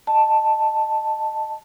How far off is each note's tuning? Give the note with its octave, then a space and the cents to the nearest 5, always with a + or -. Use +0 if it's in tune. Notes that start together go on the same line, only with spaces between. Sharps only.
D#5 -15 A5 +0